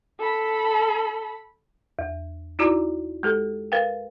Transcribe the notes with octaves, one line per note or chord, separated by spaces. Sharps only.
A4 B5
E2
D#4 E4 F#4 D5 A#5 D6
G#3 G4 A4
A#4 B4 F5 G5